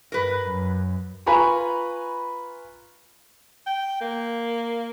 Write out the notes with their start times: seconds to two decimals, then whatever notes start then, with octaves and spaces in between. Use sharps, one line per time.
0.12 G2 A#4 B4
0.44 F#2
1.26 F4 B4 G#5 A#5 B5 C#6
3.66 G5
4.01 A#3